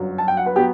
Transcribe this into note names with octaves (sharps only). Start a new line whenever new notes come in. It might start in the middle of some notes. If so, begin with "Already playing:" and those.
Already playing: G1 F#2 F#3
A5
G5
F#5
B4
F#3 B3 G4